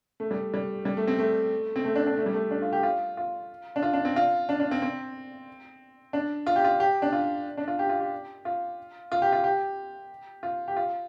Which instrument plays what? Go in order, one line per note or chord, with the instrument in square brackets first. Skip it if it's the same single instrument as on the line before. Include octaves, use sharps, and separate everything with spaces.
[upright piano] A3
G3
G3
G3
A3
C4
A3
C4
A3
D4
D4
A3
G3
A3
D4
F4
G4
F4
F4
D4
F4
D4
C4
F4
D4
D4
C4
C4
D4
F4
G4
F4
G4
D4
F4
D4
F4
G4
F4
G4
F4
F4
G4
F4
G4
F4
G4
F4